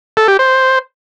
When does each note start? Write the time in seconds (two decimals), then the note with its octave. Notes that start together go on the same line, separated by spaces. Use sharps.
0.17 A4
0.28 G4
0.39 C5